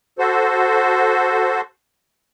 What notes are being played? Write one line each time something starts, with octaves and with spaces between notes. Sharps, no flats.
F#4 A4 C5